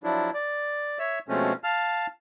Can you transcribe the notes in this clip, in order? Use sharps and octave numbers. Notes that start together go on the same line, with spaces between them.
F3 F#3 D4 E4
D5
C#5 E5
B2 F3 G#3 A3 C4 C#4
F5 A5 F6